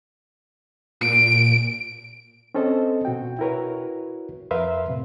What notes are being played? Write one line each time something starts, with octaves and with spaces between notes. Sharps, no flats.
A#2 D7
C4 C#4 A4 C5 D#5
B2 F#4 G5
E4 F#4 A#4 B4 C#5
F2 A#4 B4 E5 F5 C6
A2 C3